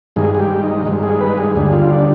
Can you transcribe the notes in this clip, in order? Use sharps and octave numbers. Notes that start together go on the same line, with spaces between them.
G2 D#3 G#3 G#4
G#4
G4
D#4
G2 D#3 G#3
G#4
B4
G#4
D#2 D3 G3 G#4
F4
D4